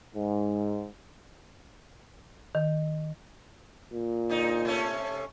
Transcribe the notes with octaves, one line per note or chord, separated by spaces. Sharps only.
G#2
D#3
A#2
G#2 D3 D#4
C3 A3 C#4